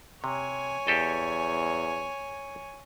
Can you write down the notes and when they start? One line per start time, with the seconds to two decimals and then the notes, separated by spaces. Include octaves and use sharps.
0.24 C3 C#5 G#5
0.87 E2 G4 A4 D#5